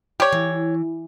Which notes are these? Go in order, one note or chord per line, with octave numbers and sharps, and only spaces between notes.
G4 C#5 D5
E3